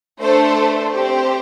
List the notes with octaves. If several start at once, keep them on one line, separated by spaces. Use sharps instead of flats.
A3 D4 A4 C5
C4 G4 C5